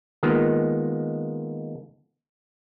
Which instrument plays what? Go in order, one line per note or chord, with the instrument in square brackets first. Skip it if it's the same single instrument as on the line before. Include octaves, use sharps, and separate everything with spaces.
[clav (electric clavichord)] D#3 G#3 A#3 B3 F4